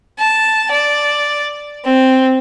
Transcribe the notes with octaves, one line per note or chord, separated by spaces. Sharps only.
A5
D5
C4